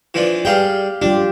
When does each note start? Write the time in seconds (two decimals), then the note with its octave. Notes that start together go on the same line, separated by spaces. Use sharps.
0.14 E3 F3 D4
0.45 G3 G4 G#4 F5 G5
1.02 G3 D4 F4 G4